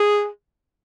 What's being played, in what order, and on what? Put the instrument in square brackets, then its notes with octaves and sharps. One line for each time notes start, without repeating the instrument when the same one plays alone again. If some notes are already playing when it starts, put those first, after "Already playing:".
Already playing: [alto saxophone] G#4